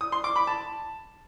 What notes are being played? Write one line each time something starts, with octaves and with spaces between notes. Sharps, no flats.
D#6
C6
D6
B5
A5